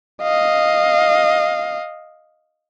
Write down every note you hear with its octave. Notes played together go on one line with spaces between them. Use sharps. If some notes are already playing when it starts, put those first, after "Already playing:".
D#5 F5